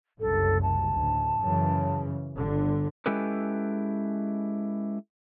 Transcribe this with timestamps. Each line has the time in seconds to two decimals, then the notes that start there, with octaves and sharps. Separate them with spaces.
0.20 F#1 C2 F#2 A4
0.62 A5
0.92 D2 A2
1.39 F#2 C#3 E3
2.36 G1 D3
3.06 G#3 C#4 E4 G4 A4 B4